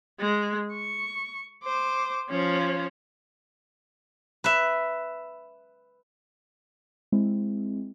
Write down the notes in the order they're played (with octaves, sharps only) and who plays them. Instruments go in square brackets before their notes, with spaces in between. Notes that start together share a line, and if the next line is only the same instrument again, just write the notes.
[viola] G#3
C#6
C5 D6
F3 C#4
[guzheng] B4 E5
[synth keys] G#3 C4 E4